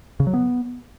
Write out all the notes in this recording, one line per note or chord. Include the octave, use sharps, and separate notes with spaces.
C#3
F#3
B3